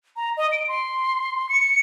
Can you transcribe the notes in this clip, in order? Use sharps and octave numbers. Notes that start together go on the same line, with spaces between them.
A#5
D#5
D7
C6
C#7